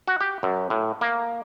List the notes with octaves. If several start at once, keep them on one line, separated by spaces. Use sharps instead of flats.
F#4
G4
F#2
A2
A#3